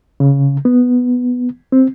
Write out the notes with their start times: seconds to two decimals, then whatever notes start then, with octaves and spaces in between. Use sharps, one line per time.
0.20 C#3
0.65 B3
1.72 C4